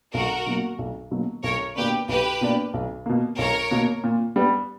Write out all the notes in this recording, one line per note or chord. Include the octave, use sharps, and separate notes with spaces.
B1 F#4 A#4
B2 F#3 A#3
B1
B2 F#3 A#3
B1 A#4 C#5
B2 A#3 D4 G4 B4
B1 G4 B4
B2 A#3 D4
B1
B2 A#3
B1 A#4 C#5
B2 A#3
A#2
G3 B3